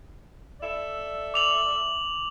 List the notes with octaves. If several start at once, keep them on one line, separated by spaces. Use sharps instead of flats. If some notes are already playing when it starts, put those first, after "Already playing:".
A4 D5 E5
D6 F7 F#7